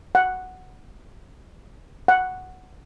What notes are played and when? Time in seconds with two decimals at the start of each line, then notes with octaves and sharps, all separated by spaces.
0.15 F#5
2.08 F#5